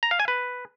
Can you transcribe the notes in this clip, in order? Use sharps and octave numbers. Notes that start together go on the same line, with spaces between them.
A#5
F5
G#5
B4